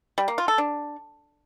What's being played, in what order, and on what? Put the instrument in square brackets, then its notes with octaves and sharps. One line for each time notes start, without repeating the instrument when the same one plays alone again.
[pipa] G3
A#3
F4
A4
D4